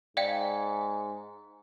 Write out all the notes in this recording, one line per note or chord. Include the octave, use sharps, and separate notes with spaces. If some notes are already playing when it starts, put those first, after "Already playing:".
G#2 D5 F5 G5